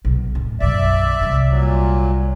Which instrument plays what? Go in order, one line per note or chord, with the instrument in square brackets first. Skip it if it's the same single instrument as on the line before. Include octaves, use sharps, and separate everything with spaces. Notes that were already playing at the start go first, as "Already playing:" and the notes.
[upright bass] B1
D1
[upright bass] B1 F#2 [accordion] D5 E5
[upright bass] C2 G3
[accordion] A#2 F#3